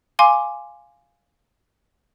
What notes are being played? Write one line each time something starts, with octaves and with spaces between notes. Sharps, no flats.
F5 G#5 C6 D6